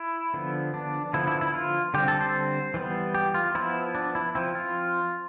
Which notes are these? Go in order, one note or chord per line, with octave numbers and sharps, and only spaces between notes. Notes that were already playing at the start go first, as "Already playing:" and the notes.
Already playing: E4
D3 F3 B3
D4
D3 F3 B3 E4
E4
E4
F4
D3 G3 C4 G4
A4
C5
E3 G3 B3
G4
F4
F3 B3 E4
D4
E4
F3 C4 E4
F4